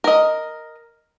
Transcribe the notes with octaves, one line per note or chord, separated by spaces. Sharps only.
A#4 D#5